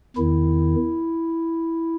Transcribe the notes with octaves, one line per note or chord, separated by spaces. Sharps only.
E2 D#3 E4